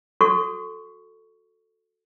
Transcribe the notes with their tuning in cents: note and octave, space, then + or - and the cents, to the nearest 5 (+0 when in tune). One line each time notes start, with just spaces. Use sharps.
F#4 -25 A4 +0 C#6 +5